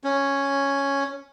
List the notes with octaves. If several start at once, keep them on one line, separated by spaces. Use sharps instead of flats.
C#4